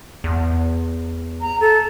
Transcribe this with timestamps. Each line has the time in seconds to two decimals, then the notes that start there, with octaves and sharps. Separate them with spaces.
0.24 E2
1.41 A#5
1.60 A4